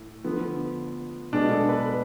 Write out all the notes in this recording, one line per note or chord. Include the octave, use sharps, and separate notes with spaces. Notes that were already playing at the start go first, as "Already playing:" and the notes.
Already playing: A2
D3 F3 B3
B2 G#3 B3 D4
A4
B4